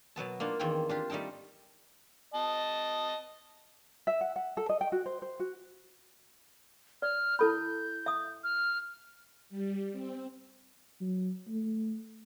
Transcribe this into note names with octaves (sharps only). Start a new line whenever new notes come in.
B2 F#3 B3 A5
A#3 D4 D#4 F4
E2 D#3 A#3 C4 G5
D4 F4 G4
G3 A3 D#4 G5 A5
D#5 A5
E5
F#5
F#5
A4
D#5
G5
F#4
C5
C5
F#4
D5 F6
E4 A4 B5 G6
E5 D#6
F6
G3
C4
F#3
A3